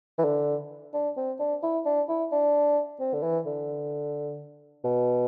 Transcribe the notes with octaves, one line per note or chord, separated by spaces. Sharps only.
E3
D3
D4
C4
D4
E4
D4
E4
D4
C4
D3
E3
D3
B2